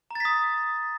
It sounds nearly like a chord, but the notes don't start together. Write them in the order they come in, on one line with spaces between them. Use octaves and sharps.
A#5 A6 B6 D#6